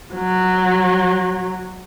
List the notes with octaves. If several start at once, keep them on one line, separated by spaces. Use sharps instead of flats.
F#3